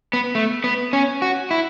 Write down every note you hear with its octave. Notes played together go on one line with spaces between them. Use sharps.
B3
A3
B3
C#4
F#4
E4